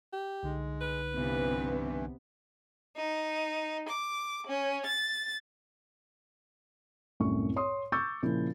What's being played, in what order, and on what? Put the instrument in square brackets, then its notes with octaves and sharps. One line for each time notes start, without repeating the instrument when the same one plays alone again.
[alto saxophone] G4
[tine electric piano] C2 D3 D#4 [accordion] G#3
[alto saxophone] B4
[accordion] G2 E3 [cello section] C3 B3
[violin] D#4
D6
C#4
A6
[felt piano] C2 F#2 A2 C#6
C#5 C6 D#6
C#6 D6 E6 G6 A6
A#2 C#3 F3 E4